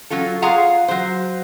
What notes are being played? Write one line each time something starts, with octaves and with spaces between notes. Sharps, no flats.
F#3 C#4 F4 A4
F4 G#4 F5 F#5 A#5
F#3 C5